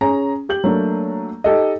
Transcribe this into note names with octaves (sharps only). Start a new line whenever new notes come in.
C#4 G#4 A#5
G4 G6 F#7
F#3 A3 A#3 D4
D#4 G4 A4 D#5